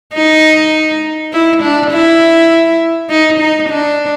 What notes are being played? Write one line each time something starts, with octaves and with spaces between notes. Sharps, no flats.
D#4
E4
D4
E4
D#4
D#4
D4